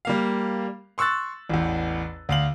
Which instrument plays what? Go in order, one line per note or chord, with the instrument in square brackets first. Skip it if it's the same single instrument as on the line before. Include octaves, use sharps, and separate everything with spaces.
[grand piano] G3 A#3 F5
C6 C#6 E6 F#6 A6
A1 E2
D2 F5 F#7